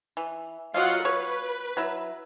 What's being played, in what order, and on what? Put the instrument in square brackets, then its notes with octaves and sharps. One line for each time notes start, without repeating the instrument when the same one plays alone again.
[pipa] E3
[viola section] F#3 F4 F#5 [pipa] C#5 D#5 F5
[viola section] B4 [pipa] C#5
[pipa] F#3 E4